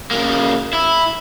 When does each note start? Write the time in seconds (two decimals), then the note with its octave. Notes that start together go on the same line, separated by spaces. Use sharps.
0.11 C#3 A#3
0.73 E4